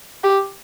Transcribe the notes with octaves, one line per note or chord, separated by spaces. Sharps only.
G4